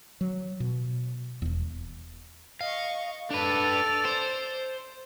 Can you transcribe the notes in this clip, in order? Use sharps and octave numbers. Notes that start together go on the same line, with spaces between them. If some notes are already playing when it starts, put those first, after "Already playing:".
F#3
B2
E1 E2
D#5 F5 C#6
D4 A4 B4 D5 F7
C5